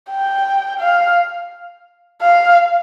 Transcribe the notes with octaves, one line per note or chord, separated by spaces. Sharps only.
G5
F5
F5